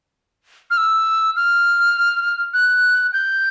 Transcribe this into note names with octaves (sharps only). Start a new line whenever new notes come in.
F6
E6
F6
F#6
G6